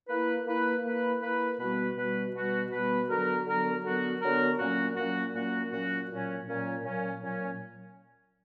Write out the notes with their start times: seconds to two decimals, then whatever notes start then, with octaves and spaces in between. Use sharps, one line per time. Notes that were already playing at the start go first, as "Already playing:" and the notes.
0.08 A#3 E4 B4
0.45 A#3 E4 B4
0.84 A#3 E4 B4
1.21 A#3 E4 B4
1.58 B2 G3 B3 F#4 B4
1.96 B2 G3 B3 F#4 B4
2.34 B2 G3 B3 F#4 B4
2.70 B2 G3 B3 F#4 B4
3.09 D3 F#3 B3 F#4 A#4
3.47 D3 F#3 B3 F#4 A#4
3.83 D3 F#3 B3 F#4 A#4
4.21 D3 F#3 B3 F#4 A#4
4.59 A#2 F#3 A#3 C#4 F#4
4.97 A#2 F#3 A#3 C#4 F#4
5.33 A#2 F#3 A#3 C#4 F#4
5.71 A#2 F#3 A#3 C#4 F#4
6.09 A#2 F#3 C#4
6.46 A#2 F#3 C#4
6.84 A#2 F#3 C#4
7.21 A#2 F#3 C#4